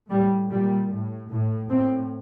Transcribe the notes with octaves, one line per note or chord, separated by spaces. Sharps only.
A2 G3
A#2 G3
A2
A2
A2 C4